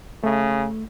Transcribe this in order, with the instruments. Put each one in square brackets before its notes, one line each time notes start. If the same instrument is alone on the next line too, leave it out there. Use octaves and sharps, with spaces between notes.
[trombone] C#3 [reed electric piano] A3